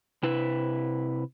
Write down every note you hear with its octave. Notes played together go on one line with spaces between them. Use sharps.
C3 E4 B4